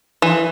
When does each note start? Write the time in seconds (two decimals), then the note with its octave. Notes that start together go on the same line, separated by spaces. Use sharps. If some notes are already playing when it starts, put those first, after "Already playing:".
0.22 E3